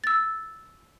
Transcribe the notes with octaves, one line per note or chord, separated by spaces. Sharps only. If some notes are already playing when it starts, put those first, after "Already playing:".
E6 A6